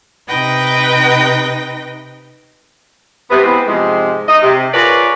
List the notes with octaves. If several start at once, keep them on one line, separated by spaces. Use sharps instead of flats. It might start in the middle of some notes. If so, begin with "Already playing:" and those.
C3 D#4 B4 G5 A#6
C3 B3
E3 G#3 B3 C4 B4 C5
G#2 C3 F3 G#3
D#4 D#5
C3
F4 G#4 A#4 B4 C#5 D5